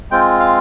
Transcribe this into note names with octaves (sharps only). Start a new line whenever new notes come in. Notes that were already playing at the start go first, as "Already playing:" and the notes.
G#3 C4 F4 G5
F5